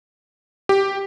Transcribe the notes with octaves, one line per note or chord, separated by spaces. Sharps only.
G4